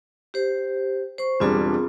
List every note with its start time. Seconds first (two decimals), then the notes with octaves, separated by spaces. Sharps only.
0.34 G4 C5
1.18 C5 C#6
1.40 E1 G3 C4 D4 F4 G#4